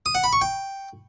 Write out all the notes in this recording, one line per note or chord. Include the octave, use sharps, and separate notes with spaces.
D#6
F#5
B5
C#6
G5